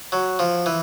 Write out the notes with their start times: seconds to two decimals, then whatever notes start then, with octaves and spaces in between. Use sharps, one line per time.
0.12 F#3
0.39 F3
0.66 E3